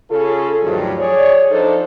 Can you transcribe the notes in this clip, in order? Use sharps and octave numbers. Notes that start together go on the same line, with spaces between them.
C#3 C#4 F4 G#4 A4
D2 G2 D#3 F3 F#3
G#4 C#5 D5
F3 D4 D#4 A4 C5